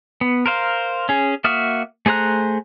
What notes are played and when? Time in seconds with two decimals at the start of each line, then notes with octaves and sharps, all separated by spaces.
0.21 B3
0.46 A#4 C5 F5
1.09 C#4 G#4
1.44 A#3 F#4 E5 D#6 F6
2.06 A3 G#4 C5 A#5 F#6